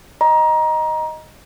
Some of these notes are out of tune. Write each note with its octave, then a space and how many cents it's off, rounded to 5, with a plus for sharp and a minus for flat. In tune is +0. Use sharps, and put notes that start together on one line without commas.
D#5 +0 A#5 +20